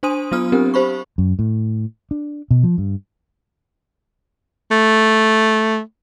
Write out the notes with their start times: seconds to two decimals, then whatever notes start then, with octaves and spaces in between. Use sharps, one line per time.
0.03 D4 C5 G#5 C6 D#6 D#7
0.32 F#3 B3 F4 D#6 F6
0.52 C4 D4 G4 A#4
0.74 G4 C5 B5 C#6
1.18 F#2
1.39 A2
2.11 D4
2.51 B2
2.63 F3
2.78 G2
4.71 A3